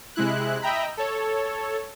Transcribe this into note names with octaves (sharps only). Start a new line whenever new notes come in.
C3 G#3 E4 F#6
D#5 E5 G5 A#5 B5
A4 C#5